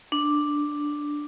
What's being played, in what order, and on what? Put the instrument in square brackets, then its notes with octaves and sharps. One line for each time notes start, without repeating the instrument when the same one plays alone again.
[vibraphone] D4